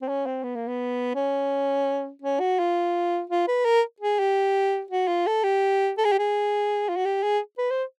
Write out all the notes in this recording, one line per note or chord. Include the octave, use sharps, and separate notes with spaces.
C4
C#4
C4
B3
A#3
B3
C#4
C#4
F#4
F4
F4
B4
A#4
G#4
G4
F#4
F4
A4
G4
A4
G#4
G4
G#4
F4
F#4
G4
G#4
B4
C5